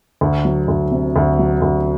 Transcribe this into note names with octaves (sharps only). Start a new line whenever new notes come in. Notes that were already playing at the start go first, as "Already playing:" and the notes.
D2
F#3
D2
C3
D2
F#3
D2